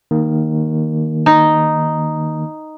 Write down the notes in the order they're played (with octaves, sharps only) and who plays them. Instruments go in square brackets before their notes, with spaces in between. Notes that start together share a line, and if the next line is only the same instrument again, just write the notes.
[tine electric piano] D#3 A#3
[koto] D#4